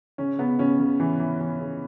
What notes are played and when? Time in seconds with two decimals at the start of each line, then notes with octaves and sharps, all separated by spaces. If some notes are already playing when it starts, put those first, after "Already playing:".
0.18 C#3 C#4
0.38 C#3 B3
0.59 C#3 C#4
0.79 C#3
1.00 E3
1.20 E3
1.40 E3
1.60 C#3